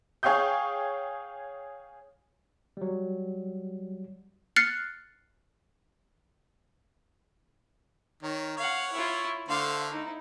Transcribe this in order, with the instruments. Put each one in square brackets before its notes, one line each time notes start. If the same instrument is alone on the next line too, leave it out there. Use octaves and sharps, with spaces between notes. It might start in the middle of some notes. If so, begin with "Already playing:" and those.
[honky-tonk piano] G#4 C#5 F5 G5 D#6 G6
[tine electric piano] F#3 G3
[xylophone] F6 F#6 A6 C7 C#7
[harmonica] D#3 [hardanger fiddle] C#5
[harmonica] C#5 [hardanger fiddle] F5 F#5
[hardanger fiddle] E4 F4
[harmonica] D3 A3 C5 [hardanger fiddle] F5
[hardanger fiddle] D#4 E4